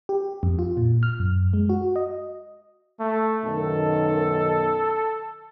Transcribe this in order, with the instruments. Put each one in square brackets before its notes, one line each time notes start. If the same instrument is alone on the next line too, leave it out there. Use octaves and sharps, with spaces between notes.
[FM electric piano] G4
F2
F4
A#2
F6
F#2
G#3
F#4
D#5
[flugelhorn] A3
[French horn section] F#2 B2 D#3 [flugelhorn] A4